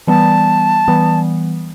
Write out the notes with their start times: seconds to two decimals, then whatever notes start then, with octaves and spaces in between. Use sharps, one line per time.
0.07 E3 G3 B3 A5
0.88 E3 G3 B3